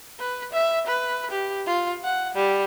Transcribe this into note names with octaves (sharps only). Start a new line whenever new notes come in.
B4
E5
B4
G4
F4
F#5
G3